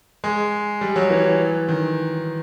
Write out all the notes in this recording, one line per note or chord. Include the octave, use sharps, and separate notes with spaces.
G#3
G3
F#3
E3
D#3